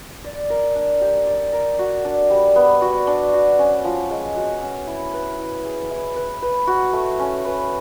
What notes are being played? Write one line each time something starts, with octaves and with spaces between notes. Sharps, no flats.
D5
A#4
D4
G4
D5
A#4
F#4
D4
G3
B3
F#4
D4
F#4
C#4
F3
G#3
F#4
C#4
E4
B4
E4
G#4
E4
B4
B4
F#4
A3
C#4
B4